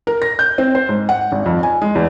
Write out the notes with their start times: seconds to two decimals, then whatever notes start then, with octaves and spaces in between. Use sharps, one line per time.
0.07 A#4
0.22 A#6
0.39 G6
0.58 C4
0.75 C5
0.89 G#2
1.09 F#5
1.32 G#1
1.46 F2
1.63 G#5
1.82 G#3
1.95 E2